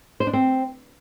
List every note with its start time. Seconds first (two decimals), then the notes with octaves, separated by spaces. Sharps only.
0.20 C5
0.27 D4
0.33 C4